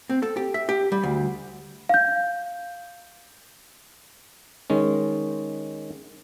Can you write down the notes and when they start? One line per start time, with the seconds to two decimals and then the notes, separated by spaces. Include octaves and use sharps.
0.09 C4
0.23 A4
0.37 G4
0.54 E5
0.69 G4
0.92 G3
1.03 D2
1.89 F5 G6
4.70 D#3 G#3 C#4